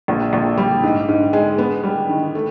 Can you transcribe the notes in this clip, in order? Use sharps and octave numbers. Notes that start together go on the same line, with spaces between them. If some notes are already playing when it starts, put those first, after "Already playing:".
A#1
A#1
G3
G#2
G#2
G#3
B3
G3
D#3
A3